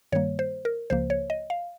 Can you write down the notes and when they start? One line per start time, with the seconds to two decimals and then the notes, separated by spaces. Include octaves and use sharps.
0.12 G2 D#3 G3 A#3 C#5
0.39 C5
0.65 A#4
0.90 C#2 C#3 F3 A#3 C5
1.10 C#5
1.30 D#5
1.50 F5